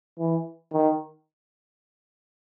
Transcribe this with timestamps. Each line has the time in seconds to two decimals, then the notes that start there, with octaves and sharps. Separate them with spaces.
0.20 E3
0.73 D#3